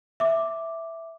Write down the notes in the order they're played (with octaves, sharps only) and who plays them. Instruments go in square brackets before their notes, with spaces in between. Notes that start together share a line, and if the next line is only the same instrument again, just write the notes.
[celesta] E5 D6